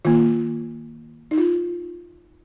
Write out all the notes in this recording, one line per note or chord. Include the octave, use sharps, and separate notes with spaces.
D#3 A#3 F4
D#4
F4